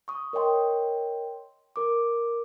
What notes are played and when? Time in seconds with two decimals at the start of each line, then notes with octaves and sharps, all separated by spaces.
0.08 C#6 D#6
0.33 A#4 C#5 D#5 G5 C6
1.76 A#4 D6